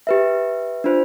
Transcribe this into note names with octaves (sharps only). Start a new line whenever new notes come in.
G4 B4 E5
D4 F4 C5